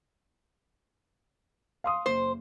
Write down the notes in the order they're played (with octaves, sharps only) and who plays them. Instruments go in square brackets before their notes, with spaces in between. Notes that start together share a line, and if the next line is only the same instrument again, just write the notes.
[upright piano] F5 C6 D#6
[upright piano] F#1 [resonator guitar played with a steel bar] C5